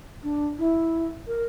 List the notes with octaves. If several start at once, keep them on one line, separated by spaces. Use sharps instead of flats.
D4
E4
A#4